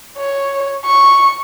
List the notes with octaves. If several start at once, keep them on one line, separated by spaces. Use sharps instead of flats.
C#5
C#6